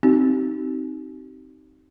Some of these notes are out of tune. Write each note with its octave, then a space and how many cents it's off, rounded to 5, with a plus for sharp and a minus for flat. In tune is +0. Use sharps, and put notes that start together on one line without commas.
C4 +5 D#4 +0 G4 -35